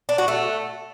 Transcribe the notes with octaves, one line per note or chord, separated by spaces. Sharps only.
D4
F#4
A3